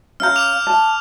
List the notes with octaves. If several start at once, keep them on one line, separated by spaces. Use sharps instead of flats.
C#4 F5 A#5 F6 G6
D6 F7
A5